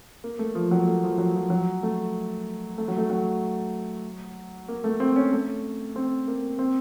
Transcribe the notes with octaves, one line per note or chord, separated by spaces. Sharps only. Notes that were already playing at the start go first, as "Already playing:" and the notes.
A#3
A3
F3
F#3
A3
F3
F#3
F3
F#3
A3
A3
F#3
A3
F#3
A#3
A3
C4
C#4
A3
C4
A#3
C4